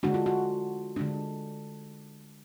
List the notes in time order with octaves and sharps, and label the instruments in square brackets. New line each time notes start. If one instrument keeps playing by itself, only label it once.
[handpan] D3 G#3 D4 F#4
F4
F#4
D3 G#3 D4